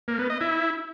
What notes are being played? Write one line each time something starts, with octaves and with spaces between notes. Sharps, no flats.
A#3
B3
D#5
E4